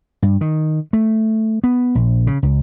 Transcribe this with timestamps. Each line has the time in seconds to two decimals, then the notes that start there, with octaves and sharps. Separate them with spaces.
0.22 G2
0.41 D#3
0.93 A3
1.64 B3
1.95 A#1
2.27 C#3
2.43 C#2